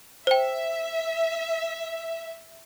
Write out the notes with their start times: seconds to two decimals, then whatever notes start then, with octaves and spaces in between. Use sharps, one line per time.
0.27 C5 E5 G5